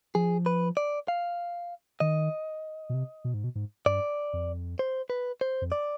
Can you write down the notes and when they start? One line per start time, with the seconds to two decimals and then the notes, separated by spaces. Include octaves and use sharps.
0.15 F3 G#4
0.46 B4
0.77 D5
1.08 F5
2.00 D#3 D#5
2.89 B2
2.94 C3
3.24 B2
3.34 G#2
3.44 B2
3.55 G#2
3.86 G2 D5
4.33 F2
4.79 C5
5.10 B4
5.41 C5
5.62 F2
5.72 D5